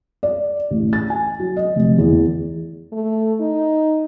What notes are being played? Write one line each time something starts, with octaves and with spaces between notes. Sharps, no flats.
D5
A1
A6
G#5
F#3
D#5
F1
E2
A3
D#4